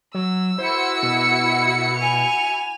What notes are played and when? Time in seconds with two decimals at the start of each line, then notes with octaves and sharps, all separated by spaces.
0.14 F#3 E6
0.58 E4 F#4 C5 C#7
1.03 B2
1.96 G#5 F7